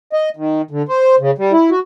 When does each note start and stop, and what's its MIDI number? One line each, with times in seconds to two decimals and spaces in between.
0.13 0.29 75
0.37 0.62 51
0.71 0.82 50
0.89 1.16 72
1.20 1.31 49
1.38 1.52 55
1.52 1.70 64
1.71 1.79 66